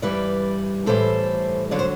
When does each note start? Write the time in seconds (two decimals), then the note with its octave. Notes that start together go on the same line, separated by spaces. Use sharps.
0.02 G2 E3 G3 B4 D5
0.86 A2 E3 G3 A4 C5
1.71 D3 F#3 D5
1.79 C5